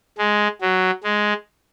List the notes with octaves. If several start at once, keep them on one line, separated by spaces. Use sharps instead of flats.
G#3
F#3
G#3